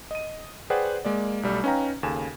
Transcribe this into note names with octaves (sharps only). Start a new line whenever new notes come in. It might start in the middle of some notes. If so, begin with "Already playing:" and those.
D#5 D#7
G#4 B4 C5 D5 F#5 G5
G#3 A#3 D5
B1 G3 A3
C#4 D#4 B4 F5 G5 A#5
D#2 C#3 A4 G#5 E7